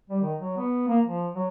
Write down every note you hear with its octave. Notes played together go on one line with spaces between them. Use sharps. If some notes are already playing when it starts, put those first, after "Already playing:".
G3
D#3
F#3
B3
A#3
F3
F#3